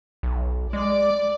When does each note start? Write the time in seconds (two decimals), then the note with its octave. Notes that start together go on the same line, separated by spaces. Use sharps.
0.23 B1
0.73 G#3 D5